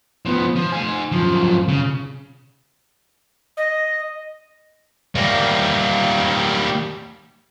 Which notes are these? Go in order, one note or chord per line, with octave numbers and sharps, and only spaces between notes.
F3 B3
F3
C5 G#5
F#2 F3
C#3
D#5
G3 A#3